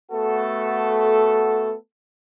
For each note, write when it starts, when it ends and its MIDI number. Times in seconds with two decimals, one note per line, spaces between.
0.11 1.75 57
0.11 1.75 59
0.11 1.75 66
0.11 1.75 69